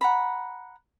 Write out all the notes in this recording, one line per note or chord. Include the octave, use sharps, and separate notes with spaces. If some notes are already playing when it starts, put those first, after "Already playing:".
F#5 A#5 B5